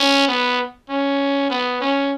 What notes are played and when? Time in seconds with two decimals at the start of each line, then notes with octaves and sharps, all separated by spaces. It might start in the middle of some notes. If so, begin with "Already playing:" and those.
Already playing: C#4
0.28 B3
0.90 C#4
1.50 B3
1.81 C#4